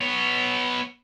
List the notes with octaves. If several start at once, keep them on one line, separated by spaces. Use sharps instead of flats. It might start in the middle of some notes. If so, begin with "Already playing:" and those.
B3 C#5